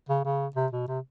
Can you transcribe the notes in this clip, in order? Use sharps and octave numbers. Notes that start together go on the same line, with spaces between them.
C#3
C#3
C3
B2
C3